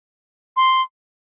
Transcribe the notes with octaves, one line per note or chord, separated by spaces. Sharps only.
C6